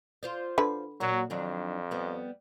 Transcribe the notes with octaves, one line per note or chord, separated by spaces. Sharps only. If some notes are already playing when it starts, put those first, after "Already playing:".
F4 C5 D5
D3 B4
A#2 F#3 A#3 F#4
F2 D#3 F#3 D4
G3 B3